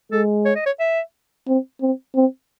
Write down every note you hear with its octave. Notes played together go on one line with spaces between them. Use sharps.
G#3 A4
C#5
D#5
C#5
E5
C4
C4
C4